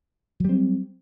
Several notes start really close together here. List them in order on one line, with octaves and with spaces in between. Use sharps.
F#3 G3 C4